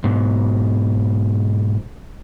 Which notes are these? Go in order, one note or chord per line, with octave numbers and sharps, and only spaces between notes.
G#2 B2